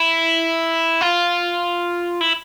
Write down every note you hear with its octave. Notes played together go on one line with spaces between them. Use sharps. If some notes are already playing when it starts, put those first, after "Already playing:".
Already playing: E4
F4
E4